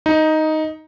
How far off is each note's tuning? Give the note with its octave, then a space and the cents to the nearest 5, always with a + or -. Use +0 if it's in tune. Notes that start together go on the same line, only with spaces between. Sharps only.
D#4 +5